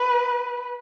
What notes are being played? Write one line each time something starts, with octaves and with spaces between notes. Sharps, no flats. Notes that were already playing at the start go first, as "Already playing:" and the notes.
Already playing: B4